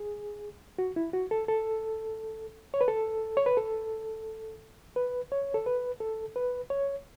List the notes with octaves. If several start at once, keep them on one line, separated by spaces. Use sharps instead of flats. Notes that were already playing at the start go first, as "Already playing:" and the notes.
Already playing: G#4
F#4
E4
F#4
A4
A4
C#5
B4
A4
C#5
B4
A4
B4
C#5
A4
B4
A4
B4
C#5